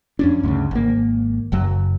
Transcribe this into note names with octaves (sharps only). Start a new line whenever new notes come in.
F2 C#4 D4
D2 G2 C#3
G#1 A#3
F#1 F#2 F#3